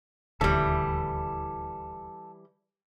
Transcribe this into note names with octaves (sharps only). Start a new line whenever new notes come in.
D#1 D2 E3 G3 A4